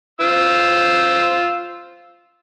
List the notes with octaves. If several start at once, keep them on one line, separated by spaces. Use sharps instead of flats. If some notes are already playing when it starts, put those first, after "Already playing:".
F4 C5 E6